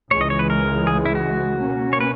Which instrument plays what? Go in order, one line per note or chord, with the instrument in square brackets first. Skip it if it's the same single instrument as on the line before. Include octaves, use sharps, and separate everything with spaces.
[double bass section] C#2 C#3 E3 G#3 [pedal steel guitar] C#5
[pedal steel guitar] D#5
C#5
B4
A#4
G#4
E4
F#4
[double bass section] B2 A#3 C#4
[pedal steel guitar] C#5
B4